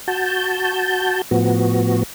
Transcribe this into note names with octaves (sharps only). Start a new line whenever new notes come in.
F#4 A5 G6
A2 F3 B3 F#4